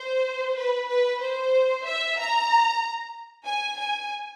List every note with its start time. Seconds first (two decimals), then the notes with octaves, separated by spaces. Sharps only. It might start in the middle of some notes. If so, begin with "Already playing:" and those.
Already playing: C5
0.57 B4
0.89 B4
1.21 C5
1.86 E5
2.18 A#5
3.46 G#5
3.79 G#5